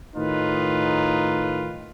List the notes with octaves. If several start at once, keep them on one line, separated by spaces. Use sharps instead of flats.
A2 D#3 D#4 F4 B4